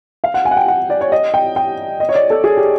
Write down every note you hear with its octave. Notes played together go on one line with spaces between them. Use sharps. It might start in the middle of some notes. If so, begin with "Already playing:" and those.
F5
F#5
G#5
F#5
G5
F#5
D5
C#5
D#5
G5
G5
D#5
C#5
D5
A4
G#4
G4